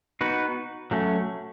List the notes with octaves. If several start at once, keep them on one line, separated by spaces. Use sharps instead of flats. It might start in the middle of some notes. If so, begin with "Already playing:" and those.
B3 D#4 F#4 B4
F#3 A3 C#4